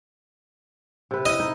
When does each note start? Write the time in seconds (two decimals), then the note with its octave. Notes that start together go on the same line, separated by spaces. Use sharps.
1.11 C3 B4
1.26 E4 D#5
1.40 D#4